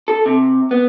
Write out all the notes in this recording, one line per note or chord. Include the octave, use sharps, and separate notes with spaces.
A4
C3
B3